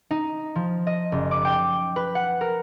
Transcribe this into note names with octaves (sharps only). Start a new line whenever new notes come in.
D#4
F3
D#5
F#1
D6
G5
B4
F#5
A#4